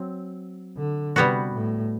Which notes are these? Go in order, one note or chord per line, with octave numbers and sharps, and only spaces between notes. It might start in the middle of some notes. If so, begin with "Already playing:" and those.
Already playing: F#3 C4
D3
C3 G3 B3 F#4
A2